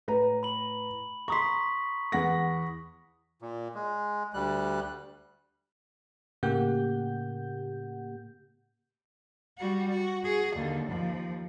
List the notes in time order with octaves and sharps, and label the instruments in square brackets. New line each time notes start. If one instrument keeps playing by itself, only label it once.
[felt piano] A2 B4 A#5
[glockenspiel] B5 F#7
[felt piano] A#5 C6 [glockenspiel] C#6 D#6 B6
[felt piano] E2 F#5 A#6
[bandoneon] A#2
G#3
D2 G3 F#6
[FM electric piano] A2 C#3 A#3 G4 F#5 G6
[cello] G3 F#4
F#4
F#4 G#4
D#2 D3
D#2 F3